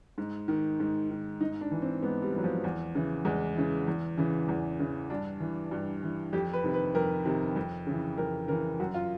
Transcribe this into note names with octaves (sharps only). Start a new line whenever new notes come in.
G#2
D#3
G#2
D#3
G#2 D#4
D4
E3
C4
G#2 B3
G3
E3 F#3
F3
E2
C#3 E3
E2 G#3
C#3 E3
E2
C#3 E3
E2
C#3 E3
G2 D4
E3
G2
E3
F2 G4
B4
C3 D#3
B4
F2 A#4
C3 D#3
F2
C#3 E3
F2 A#4
C#3 E3 A#4
F#2 F#4
F4